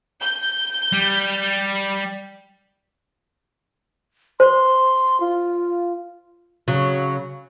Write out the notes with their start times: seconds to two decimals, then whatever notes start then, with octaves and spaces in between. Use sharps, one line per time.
0.23 G6
0.92 G3
4.40 C5 C6
5.20 F4
6.68 C#3 F#3